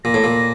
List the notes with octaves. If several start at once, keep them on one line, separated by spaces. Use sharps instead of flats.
A#2 A#6
A2
A#2